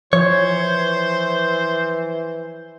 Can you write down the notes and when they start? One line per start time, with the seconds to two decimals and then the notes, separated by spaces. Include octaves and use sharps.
0.13 E3 F3 C5 C#5